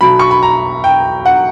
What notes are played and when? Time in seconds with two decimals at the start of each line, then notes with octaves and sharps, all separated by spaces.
0.01 B1 B2 F#3 B5
0.19 C#6
0.31 B5
0.43 A#5
0.84 G5
1.26 F#5